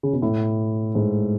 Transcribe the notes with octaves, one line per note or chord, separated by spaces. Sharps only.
C#3
B2
A2
G#2